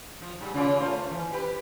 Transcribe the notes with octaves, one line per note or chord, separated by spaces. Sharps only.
F3
G#2 G3
C#3 F4 D5
A3 F4 C5
E3
G4 B4